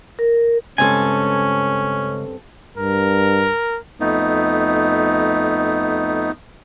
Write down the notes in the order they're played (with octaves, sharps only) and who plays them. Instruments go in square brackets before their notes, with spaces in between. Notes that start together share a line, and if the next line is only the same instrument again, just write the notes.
[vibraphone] A#4
[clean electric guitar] C#2 G#5 [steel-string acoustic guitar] G2 C4 A4 [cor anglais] C#4
[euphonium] G2 [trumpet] A#4
[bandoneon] F2 A3 B3 D#4